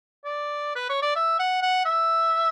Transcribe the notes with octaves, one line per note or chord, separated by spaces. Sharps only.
D5
B4
C#5
D5
E5
F#5
F#5
E5